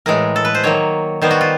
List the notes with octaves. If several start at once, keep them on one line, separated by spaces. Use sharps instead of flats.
A2 E3 G#3 A#4
A4
B4
C5
D#3 F#3 A#3 C#5
D#3 G3 B3 C5
F#4
F4